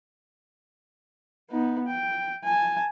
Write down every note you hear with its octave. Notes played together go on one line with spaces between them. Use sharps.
B3 D#4
G5
G#5 A5